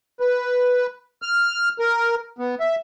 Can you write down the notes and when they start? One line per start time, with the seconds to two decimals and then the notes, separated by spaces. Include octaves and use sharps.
0.20 B4
1.22 F6
1.79 A#4
2.39 B3
2.60 E5